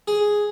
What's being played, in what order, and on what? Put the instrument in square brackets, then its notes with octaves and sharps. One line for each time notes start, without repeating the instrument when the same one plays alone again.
[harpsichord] G#4